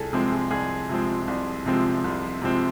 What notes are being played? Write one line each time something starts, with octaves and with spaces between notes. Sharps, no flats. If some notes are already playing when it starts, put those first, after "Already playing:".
Already playing: C2 G#4 A4
C3 F3 G#3 C4 G#4
G#4
C2 G#4
C3 F3 G#3 C4
C2
C3 F3 G#3 C4
C2
C3 F3 G#3 C4